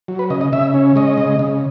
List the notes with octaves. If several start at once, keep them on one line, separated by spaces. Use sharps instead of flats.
F#3
B4
C#3 D#5
D#5
C#3 E5
C#4
G#3 D#5
C#3
C#3